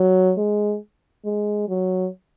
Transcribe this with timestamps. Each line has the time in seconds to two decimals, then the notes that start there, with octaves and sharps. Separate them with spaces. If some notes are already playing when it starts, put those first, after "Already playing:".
Already playing: F#3
0.37 G#3
1.25 G#3
1.68 F#3